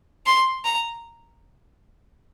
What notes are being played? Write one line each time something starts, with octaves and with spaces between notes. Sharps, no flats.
C6
A#5